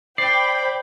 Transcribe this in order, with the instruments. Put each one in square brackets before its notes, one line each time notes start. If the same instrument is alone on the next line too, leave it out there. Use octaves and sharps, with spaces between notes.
[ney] C5 [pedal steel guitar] D5 [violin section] G5 B5 [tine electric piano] C7